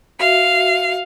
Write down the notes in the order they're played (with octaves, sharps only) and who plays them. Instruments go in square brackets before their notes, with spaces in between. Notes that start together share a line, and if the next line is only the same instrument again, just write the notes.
[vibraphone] F#4 E5 [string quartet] F5